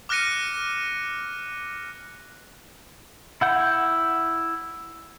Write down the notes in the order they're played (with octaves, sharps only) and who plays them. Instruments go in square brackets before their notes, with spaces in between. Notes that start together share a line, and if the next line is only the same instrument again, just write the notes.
[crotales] D6 F6 F#6 A#6 C#7 D#7
[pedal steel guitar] E4 F#5 G6